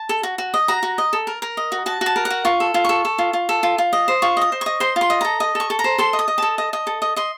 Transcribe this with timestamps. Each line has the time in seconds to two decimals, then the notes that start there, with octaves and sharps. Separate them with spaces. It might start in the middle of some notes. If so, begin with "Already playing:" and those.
Already playing: A5
0.09 A4
0.23 F#4
0.38 F#4
0.54 D#5
0.68 F#4 A#5
0.83 F#4
0.98 D#5
1.13 A4
1.27 A#4
1.42 A#4
1.57 D#5
1.72 F#4
1.86 F#4 A5
2.01 F#4
2.06 A5
2.16 A#4
2.25 F#5
2.30 F#4
2.45 F4 C#6
2.60 A4
2.74 F4
2.85 A4 C#6
3.05 A4
3.18 F4
3.33 F4
3.49 A4
3.63 F4
3.78 F4
3.93 D#5
4.08 C5
4.22 F4 C#6
4.37 D#5 D#6
4.52 C5
4.61 D#5 C#6
4.80 C5 C6
4.96 F4
5.01 C6
5.10 D#5
5.21 A4 A#5
5.40 D#5
5.55 A4 C#6
5.70 A4
5.79 A#5
5.84 C5
5.98 A4 C6
6.13 D#5
6.19 D#6
6.28 D#5
6.38 A4 A5
6.58 D#5
6.73 D#5
6.87 A4
7.02 D#5
7.16 D#5 C6